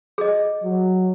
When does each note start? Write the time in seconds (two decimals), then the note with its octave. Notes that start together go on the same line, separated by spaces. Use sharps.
0.18 G#4 D#5
0.63 F#3